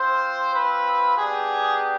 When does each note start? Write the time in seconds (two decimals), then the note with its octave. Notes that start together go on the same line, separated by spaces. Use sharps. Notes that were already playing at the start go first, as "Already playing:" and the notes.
Already playing: C4 F4 C5
0.52 B4
1.16 B3 D4 G4 G#4